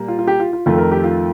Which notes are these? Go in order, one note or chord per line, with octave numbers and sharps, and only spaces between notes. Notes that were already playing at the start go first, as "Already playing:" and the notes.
Already playing: A#2 G3 A#3
F4
F4
G4
F4
F4
F2 D#3 A3 F4
A#4
G4
F4